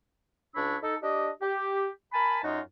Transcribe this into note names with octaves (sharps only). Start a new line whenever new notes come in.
C#2 D4 C#5 B5 E6
D#4 A4
D4 G4 D#5
G4
A#4 G#5 A5 B5
F#2 D#4 F4 F#4 D#5